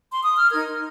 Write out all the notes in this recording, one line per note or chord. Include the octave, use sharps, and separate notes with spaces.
C6
D#6
F6
D#4 A#4 G#6